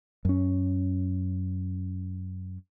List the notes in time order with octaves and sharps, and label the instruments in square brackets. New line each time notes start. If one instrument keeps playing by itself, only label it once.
[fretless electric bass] F#2 C#4